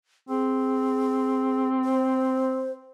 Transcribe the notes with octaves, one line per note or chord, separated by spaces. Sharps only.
C4 G#4
C5